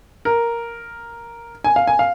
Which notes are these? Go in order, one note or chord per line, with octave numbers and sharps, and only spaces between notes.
A#4
G#5
F5
G#5
F5